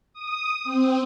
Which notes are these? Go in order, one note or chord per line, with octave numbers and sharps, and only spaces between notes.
D#6
C4